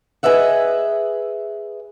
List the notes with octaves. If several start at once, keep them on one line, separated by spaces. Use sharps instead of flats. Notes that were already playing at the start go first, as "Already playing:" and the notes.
G#4 B4 D#5 E5 F#5